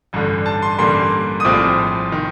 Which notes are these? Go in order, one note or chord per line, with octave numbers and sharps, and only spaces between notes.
A1 G2 D3
A5
C6
A1 G2 D3 G3 A#3 C6
D#6
A#1 A2 F3 C4 F4 D6
D#3